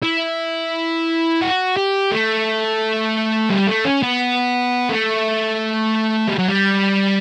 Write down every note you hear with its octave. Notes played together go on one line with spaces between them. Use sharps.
E4
F#4
G4
A3
G3
A3
C#4
B3
A3
G3
F#3
G3